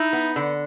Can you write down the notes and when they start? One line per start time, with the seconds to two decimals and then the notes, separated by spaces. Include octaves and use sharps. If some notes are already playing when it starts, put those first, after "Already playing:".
Already playing: D#4 E4
0.13 B3
0.36 D3